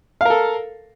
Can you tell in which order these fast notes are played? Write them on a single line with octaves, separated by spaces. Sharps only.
F5 A#4 A4